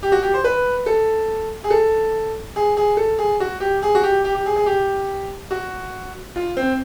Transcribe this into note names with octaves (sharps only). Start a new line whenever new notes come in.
G4
F#4
G4
C5
B4
A4
G#4
A4
G#4
G#4
A4
G#4
F#4
G4
G#4
F#4
G4
G4
G4
G#4
G#4
G4
F#4
F4
C4